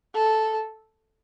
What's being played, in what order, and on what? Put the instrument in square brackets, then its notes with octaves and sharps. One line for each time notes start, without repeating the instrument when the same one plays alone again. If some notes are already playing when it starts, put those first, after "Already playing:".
[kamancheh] A4